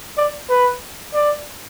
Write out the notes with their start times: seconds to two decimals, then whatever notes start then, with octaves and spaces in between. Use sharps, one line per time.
0.17 D5
0.49 B4
1.14 D5